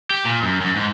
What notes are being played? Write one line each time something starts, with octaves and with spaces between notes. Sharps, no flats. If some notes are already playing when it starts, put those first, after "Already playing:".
G4
A#2
F#2
F#2
G#2